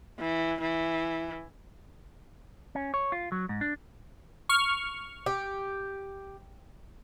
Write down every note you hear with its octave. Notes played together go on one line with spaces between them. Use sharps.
E3
E3
C#4
C#5
F4
F#3
G#2
D4
C#6 F6
G4